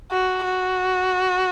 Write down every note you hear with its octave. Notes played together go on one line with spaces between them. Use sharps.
F#4
F#4